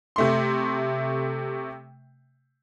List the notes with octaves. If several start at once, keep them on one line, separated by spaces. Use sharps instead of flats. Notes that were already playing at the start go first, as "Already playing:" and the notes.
C3 A3 C6